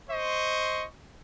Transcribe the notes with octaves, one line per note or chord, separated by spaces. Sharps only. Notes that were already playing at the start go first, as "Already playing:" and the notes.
C5 D#5 C6 C#6